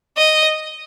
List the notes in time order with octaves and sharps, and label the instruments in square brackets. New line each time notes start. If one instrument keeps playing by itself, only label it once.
[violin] D#5